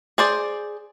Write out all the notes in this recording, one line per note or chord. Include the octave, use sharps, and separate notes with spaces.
G#4 C5 D5